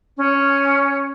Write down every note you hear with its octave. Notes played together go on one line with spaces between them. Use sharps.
C#4